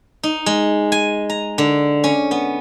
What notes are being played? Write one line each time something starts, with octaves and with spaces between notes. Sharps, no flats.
D#4
G#3
G#5
A#5
D3
C#4
B3